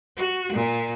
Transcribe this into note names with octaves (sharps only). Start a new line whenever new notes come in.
F#4
A#2